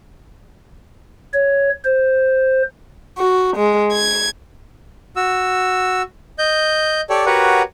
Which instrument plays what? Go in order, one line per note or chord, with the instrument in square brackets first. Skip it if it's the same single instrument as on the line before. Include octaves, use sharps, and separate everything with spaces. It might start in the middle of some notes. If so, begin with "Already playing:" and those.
[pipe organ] C#5
C5
[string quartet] F#4
G#3
G#6
[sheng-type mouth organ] F#4 E6
D#5 G6
G4 A4 C#5 D5
F#4 G4 A#4 B4 C#5 F#5